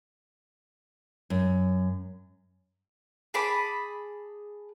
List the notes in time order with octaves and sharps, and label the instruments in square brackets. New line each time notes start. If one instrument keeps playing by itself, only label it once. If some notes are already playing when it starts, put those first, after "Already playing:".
[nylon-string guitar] F#2
[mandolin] G#4 A5 B5 D6